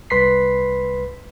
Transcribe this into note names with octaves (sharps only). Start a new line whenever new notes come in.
C2 B4 B5 C6 B6 C7